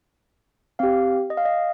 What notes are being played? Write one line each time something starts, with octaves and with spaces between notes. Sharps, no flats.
C4 G4 F5
D#5
F5
D#5